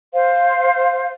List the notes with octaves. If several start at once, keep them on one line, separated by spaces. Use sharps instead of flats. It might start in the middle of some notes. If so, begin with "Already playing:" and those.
C5 F5